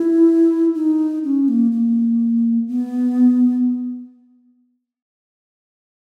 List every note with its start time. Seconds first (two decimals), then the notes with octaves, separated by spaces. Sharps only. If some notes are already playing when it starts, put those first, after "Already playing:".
Already playing: E4
0.75 D#4
1.24 C#4
1.48 A#3
1.72 A#3
2.68 B3